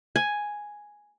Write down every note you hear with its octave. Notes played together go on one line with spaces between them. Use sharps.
G#5